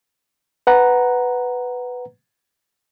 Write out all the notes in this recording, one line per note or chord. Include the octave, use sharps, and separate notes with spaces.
B4 F#5 A#5